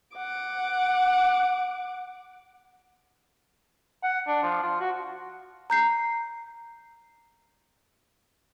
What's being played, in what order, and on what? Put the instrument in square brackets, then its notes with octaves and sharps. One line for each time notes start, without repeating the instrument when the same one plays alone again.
[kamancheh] F#5 D6
[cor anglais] F#5
D4
F3
F4
F#4
[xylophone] A#5 G6 C7